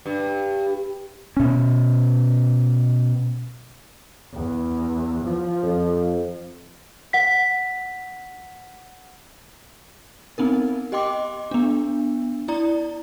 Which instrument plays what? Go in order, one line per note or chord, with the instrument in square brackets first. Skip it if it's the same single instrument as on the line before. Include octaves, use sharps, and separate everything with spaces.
[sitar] G2
[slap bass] B2 C#4
[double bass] E2
F3
[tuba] F2
[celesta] F#5 B6
[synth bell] B3 C4 D#4 A#4
G4 D#5 G5 C6 D6
B3 D4
E4 D5 A#5